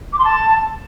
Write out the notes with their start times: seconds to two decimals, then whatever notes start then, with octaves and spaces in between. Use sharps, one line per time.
0.13 D6
0.18 C6
0.24 A5